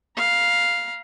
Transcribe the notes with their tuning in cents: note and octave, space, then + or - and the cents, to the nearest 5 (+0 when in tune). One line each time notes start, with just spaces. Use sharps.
F5 +0 A#5 +40